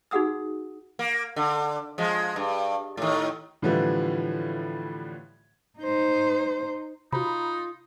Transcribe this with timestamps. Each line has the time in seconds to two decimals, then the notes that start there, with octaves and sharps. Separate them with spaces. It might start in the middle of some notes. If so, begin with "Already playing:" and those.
0.11 D#4 F#4 G#4 F#5 D#6 E6
0.99 A#3
1.36 D3
1.98 F3 G#3
2.36 G2
2.97 A2 D#3
3.62 A2 D3 E3 F3 G3
5.79 D#4 C5
7.13 C3 D#4 F4 F#4 A#5 B5